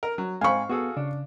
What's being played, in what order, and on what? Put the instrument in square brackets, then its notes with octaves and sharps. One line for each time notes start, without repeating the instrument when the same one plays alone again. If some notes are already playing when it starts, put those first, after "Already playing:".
[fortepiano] A#4
F#3
[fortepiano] G#2 C4 B5 [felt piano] F5 C#6 [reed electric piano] G#5
[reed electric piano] B3 [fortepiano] F#4 G#4 A4
[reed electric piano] C#3 [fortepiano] D4